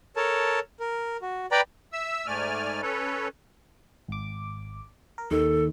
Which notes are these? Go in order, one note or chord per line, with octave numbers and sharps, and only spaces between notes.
A4 A#4 C#5 A5
A#4
F#4
B4 D5 G5 A#5 B5
E5 E6
G#2 A3 D5 G#5 F6
C#4 A4 B4 C#5
G#1 D6
A#4
D#2 D#3 A4